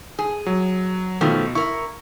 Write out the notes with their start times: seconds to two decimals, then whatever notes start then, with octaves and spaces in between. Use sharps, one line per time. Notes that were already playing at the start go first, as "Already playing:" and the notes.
0.19 G#4
0.46 F#3
1.21 B2 D#3 F3 A3
1.55 E4 A#4 C#6